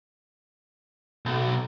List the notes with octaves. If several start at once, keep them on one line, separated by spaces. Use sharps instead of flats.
B1